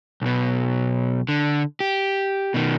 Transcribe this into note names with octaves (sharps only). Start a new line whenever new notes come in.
B1 B2
D3
G4
B2 D#3